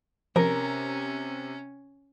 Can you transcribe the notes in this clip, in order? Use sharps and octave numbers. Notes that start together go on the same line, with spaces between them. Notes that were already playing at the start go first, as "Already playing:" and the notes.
C3 F3 C#4 A#4